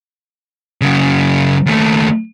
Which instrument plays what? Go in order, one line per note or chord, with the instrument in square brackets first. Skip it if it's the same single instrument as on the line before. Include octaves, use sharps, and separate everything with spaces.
[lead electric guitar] F#2 C#3
D#2 A3